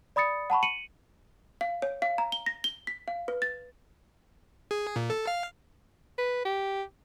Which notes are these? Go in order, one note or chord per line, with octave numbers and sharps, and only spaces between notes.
D5 B5 D#6 A6 C#7
F#5 A5 B5 C#6
C#7 D#7 F#7
F5
C#5
F5
A#5
G7
A#6
G7
B6
F5
B4
A6
G#4
A#2
A4
F5
B4
G4